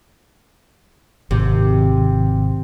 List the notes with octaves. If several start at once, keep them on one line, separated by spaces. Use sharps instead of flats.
G#1 C3